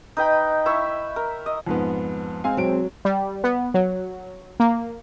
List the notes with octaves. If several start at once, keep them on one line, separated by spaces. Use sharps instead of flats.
D#4 B4 G5 B5
E4 E5 B5 C#6
A#4
D#5
F2 G#2 B3
G#3 C4 F5 G#5
B1 F#3 D7
G3
B3
F#3
A#3